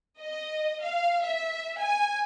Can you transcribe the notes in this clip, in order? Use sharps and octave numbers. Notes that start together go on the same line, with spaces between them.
D#5
F5
E5
G#5